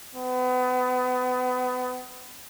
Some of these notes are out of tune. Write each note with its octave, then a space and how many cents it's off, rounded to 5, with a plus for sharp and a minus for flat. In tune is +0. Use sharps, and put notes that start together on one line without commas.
B3 +30